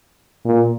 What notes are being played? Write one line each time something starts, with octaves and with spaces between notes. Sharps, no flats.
A#2